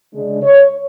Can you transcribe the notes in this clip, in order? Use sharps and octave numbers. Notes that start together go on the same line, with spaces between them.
C#3 G#3 D4
C#5